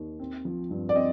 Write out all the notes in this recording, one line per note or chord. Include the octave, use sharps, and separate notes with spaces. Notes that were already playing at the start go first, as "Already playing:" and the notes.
Already playing: D#2
C4
F3
G2
D5
C4 D#5